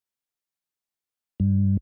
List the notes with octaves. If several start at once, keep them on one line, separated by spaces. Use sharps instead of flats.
G2